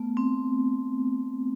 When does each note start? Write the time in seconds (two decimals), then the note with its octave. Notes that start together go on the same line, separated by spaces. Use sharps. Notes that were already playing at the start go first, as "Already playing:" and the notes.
Already playing: A3 B3
0.17 C4